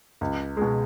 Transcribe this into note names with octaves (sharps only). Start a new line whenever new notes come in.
C#2
B2 G#3